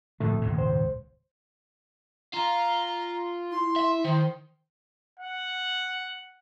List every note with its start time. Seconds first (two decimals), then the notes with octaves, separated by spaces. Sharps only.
0.20 C2 A2 D3 F3 A3 E5
0.41 D#1 C#2 G#2
0.58 C5
2.34 F4 A#5
3.52 E4 C6
3.76 E5
4.04 D#3 C5
5.20 F#5